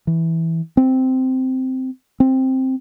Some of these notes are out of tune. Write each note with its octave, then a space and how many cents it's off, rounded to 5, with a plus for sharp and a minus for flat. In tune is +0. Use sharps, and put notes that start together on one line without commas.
E3 -10
C4 -10
C4 +5